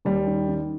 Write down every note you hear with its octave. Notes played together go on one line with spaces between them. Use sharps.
D#2 G3
D#3
D#3